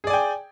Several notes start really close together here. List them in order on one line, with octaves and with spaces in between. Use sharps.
G#4 D5 G#5 G5